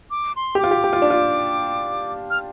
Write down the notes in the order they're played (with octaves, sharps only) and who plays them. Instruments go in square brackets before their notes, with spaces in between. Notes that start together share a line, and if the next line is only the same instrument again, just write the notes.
[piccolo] D6
C6
[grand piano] G4
[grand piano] F4 [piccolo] D6
[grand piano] G4
G4
F4
D4
F4
[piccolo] F6